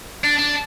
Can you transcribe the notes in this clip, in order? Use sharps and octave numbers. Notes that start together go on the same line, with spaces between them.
D4
D4